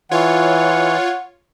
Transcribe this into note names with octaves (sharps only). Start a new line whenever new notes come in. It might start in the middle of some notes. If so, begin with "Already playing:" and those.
E3 F4 C#5 F#5